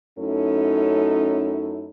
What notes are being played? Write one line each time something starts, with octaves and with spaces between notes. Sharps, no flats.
F#2 A3 C#4 D#4 E4 A4